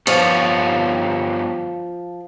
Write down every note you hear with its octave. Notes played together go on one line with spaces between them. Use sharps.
G2 F3 B3 C#5